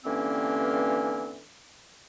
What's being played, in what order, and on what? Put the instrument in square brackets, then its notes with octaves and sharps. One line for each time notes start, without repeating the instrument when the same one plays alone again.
[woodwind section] G2 D3 E3 A#3 C4 C#4